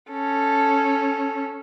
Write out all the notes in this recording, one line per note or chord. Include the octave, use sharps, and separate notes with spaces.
C#4 A4